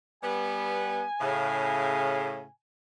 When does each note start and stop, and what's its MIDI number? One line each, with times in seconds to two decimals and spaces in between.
0.23 1.02 55
0.23 1.02 59
0.23 2.52 80
1.21 2.44 45
1.21 2.44 49